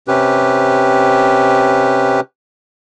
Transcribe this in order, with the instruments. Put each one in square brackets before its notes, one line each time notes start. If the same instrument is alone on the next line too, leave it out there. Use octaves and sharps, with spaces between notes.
[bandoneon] C3 C#4 G4 B4